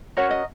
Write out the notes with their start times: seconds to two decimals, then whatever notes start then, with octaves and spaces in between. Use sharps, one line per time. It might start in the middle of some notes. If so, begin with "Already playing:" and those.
0.17 C#4 F#4 A#4 C#5
0.31 D#5